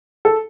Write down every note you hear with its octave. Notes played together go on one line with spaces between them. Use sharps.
A4